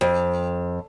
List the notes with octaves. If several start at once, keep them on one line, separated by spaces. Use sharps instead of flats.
F2